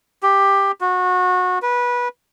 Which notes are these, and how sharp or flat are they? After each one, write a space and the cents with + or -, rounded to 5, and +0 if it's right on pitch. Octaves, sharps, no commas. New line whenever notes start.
G4 +10
F#4 -25
B4 -20